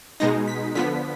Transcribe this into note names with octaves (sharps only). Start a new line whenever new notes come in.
B2 G#3 D#4 A#6
B6
D3 F3 B3 B6